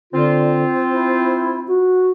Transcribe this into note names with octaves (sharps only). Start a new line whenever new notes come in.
D3 C4 F4
E4
F#4